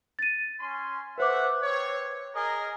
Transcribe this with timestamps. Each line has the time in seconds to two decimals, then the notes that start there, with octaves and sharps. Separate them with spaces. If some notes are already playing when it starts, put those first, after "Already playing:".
0.19 A6 D#7
0.60 C#4 C6
1.18 A3 B4 C5 E5 F#5 D6
1.63 C4 C#5
2.35 G#4 A#4 D#5